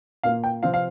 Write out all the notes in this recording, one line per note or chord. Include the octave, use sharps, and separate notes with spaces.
A#2 A#3 F4 F5
G5
C3 F3 C4 F4 F5
F5